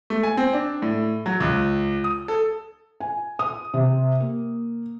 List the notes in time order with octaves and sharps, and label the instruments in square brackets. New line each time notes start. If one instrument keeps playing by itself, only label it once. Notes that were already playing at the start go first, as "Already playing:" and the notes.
[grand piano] A3
G#5
C4
D4
A2
F#3
C#2
D#6
A4
[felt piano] G#5
D#6
C3
A#3